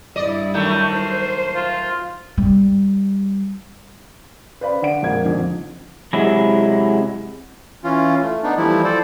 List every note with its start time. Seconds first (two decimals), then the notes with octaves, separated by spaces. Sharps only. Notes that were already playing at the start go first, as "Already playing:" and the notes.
0.16 G2 E4 D5 D#5
0.54 D#3 F#3 A3
0.91 C5
1.55 F4
2.38 G3
4.61 B4 C5 D5 F5 B5
4.82 D3 D5 F#5 D7
5.02 A#1 F2 G#3 A#3 F#5 G#6
5.24 A#1 F2 D3 D#4
6.13 C3 F#3 G#3 E4
7.84 E3 C#4 F4
8.22 A3
8.43 B3 D4 D#4
8.58 E3 F3 G3 A3 E4
8.84 A4 C5 D5